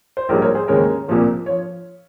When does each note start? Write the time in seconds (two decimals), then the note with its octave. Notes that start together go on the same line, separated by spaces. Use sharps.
0.17 C5
0.29 A#1 G#2 G3 A#3 A#4 C#5
0.42 A#4 C#5
0.55 G#4 C5
0.68 D#2 C#3 G#3 A#4 C#5
1.08 C2 A#2 F3 A#3
1.46 F3 C#5